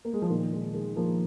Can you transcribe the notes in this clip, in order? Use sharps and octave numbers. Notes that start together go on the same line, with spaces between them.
A#3
G#3
F3
A#2 D#3
D#3 G#3
D#3 G#3
F3 A#3